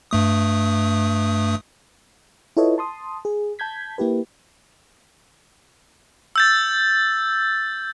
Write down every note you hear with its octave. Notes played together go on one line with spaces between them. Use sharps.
G2 A3 D#6
E4 F4 A4 B4 C#5 D#5
A5 C6 D#6
G#4
A5 G6 G#6 B6
A#3 E4 G4 B4
E6 G6 A6